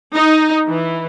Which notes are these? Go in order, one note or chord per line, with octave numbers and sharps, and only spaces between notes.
D#4
E3